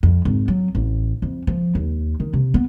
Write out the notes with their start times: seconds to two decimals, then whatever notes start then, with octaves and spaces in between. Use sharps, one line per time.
0.03 F2
0.25 G#1
0.48 F#3
0.75 A1
1.22 F2
1.47 F3
1.75 D#2
2.20 D#3
2.34 C3
2.54 B3